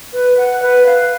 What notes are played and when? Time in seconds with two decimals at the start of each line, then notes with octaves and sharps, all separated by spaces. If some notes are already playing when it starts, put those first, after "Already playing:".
0.13 B4
0.37 F#5
0.62 B4
0.86 F5